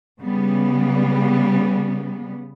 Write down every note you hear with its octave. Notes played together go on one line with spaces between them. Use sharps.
C#3 G3 B3